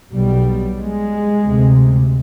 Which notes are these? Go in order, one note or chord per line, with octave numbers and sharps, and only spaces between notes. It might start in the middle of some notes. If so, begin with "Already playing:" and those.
B1 B2 G3
G#3
D2 C3